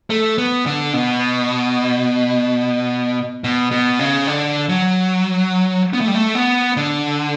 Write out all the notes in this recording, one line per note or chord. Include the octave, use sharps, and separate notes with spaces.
A3
B3
D3
B2
B2
B2
C#3
D3
F#3
B3
A3
G3
A3
B3
D3